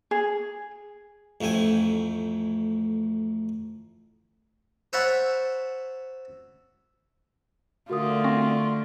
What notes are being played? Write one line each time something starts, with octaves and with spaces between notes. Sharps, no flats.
G#4
A1 F2 A3 G5 G#5
C5 C#5 E5 F#5 A5 B5
D3 A3 F4 F#4 A#4 D#6
C4 C6 C#6 A#6